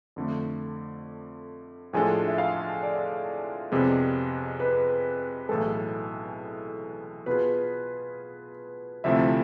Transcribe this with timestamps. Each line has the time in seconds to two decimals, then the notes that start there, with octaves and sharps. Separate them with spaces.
0.16 F2 D3 A3
1.93 A2 F3 G#3 D4 A4 G#5
2.28 E5
2.38 F5
2.83 D5
3.72 F2 C3 G#3 B3
4.60 B4
5.49 B1 A2 E3 G#3 A4
7.26 B2 B3 F4 G#4 B4
9.04 D2 C3 F3 A3 E4 E5